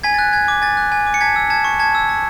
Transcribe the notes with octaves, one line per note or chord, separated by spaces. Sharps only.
G#5 G#6 B6
A6
F#6
G#5 G#6
D6
G#5 A6
F#6
G#5
D6
C#7
A5 G#6 B6
E6
A5 G#6
C#6
A5 G#6
E6
A5